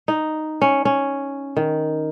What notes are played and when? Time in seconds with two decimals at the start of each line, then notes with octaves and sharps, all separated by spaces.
0.08 D#4
0.62 C#4
0.85 C#4
1.57 D#3